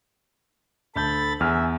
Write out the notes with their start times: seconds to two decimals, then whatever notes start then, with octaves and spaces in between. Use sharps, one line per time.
0.96 D2 A4 A5 B5 G6 A6
1.41 E2 E5 G#5 F6